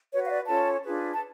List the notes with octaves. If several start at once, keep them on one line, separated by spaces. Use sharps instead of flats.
F#4 B4 C#5
F5
D5
C#4 F4 A4 C#5 A5
D4 F4 G#4 B4
A5